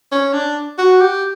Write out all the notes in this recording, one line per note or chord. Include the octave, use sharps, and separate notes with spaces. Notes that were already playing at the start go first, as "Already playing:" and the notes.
C#4
D4
F#4
G4